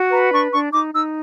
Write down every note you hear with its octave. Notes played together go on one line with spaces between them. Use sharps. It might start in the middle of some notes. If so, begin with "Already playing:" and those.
Already playing: F#4
B4 A#5
D4 C#6
D4 C#6
D#4 D6
D#4 E6